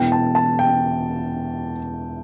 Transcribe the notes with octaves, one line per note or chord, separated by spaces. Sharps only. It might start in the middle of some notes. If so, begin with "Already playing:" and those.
Already playing: E1 E2 E3 G5
A5
A5
G5